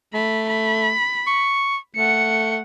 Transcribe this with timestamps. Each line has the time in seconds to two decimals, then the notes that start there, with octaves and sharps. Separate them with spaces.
0.14 A3 B5
0.49 B5
1.27 C#6
1.96 A3 F#5 C#7